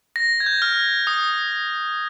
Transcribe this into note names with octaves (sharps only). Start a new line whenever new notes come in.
A#6
G#6
G6
F6
D#6